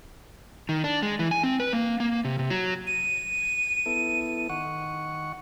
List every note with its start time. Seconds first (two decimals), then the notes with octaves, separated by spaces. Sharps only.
0.69 D#3
0.84 D4
1.03 G#3
1.19 E3
1.31 G#5
1.43 C4
1.60 B4
1.73 A#3
2.00 A#3
2.25 C3
2.39 C3
2.50 F#3
2.87 D#7
3.86 B3 E4 A4
4.49 D#3 F#5 C#6